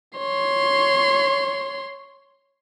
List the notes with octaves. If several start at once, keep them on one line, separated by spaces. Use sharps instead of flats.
C#5 C6